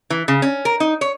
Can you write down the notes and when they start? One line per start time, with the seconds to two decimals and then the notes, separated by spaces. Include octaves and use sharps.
0.10 E3
0.28 C#3
0.42 C#4
0.65 A#4
0.80 D#4
1.01 C#5